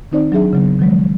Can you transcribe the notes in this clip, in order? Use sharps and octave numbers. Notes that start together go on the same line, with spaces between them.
D#3 C4 D#4 C5 D5
F#3 D4 G#4 E5
C#3 F#3 B3
D#3 F3 F#3 G#3